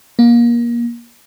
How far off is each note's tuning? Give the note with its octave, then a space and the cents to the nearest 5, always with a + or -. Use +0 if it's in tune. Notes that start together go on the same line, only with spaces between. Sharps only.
A#3 +25